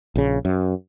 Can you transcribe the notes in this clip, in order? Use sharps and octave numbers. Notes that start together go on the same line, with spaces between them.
A#1 C#3
F#2